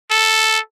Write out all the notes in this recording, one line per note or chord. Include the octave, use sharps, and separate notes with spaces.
A4